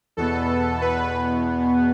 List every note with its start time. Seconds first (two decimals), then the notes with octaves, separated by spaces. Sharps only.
0.17 E2 B2 B3 A4
0.81 B4